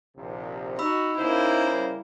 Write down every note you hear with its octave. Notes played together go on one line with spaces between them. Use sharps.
A#1 D#2 C3
D#4 F#4 B5 E6
C#3 A#3 E4 C5
G3 A#4